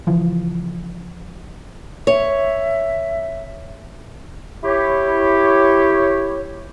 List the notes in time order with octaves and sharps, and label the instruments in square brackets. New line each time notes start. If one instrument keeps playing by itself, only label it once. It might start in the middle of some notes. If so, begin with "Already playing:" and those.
[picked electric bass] C#3 E3 F3
[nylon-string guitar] C#5 [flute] E5
[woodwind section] E4 G4 C#5